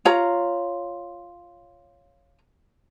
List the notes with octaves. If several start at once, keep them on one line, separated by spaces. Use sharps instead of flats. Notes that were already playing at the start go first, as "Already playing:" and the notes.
F4 C#5 A#5